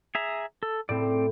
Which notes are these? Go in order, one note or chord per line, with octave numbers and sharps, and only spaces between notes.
G#4 E5 A#5
A4
A2 C4 D5